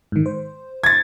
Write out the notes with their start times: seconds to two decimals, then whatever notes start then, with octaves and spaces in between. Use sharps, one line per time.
0.12 G#2 D#3
0.26 C5
0.84 G#6 A6